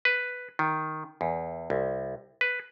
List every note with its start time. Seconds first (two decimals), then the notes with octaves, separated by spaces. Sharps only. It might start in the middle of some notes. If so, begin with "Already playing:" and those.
0.05 B4
0.59 D#3
1.21 E2
1.70 C2
2.41 B4